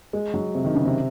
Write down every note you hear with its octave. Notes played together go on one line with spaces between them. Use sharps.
G#3
F#3
C3
D#3
C#3
C3